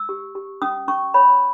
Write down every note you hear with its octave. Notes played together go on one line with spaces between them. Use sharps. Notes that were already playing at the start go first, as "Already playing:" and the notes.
Already playing: E6
G4
G4
C#4 D#6
C#4 C#6
C#5 B5